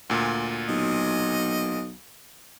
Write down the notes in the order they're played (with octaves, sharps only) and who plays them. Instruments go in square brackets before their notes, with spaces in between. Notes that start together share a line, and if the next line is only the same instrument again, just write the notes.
[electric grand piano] D2 A#2
[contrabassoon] B1 [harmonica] D#5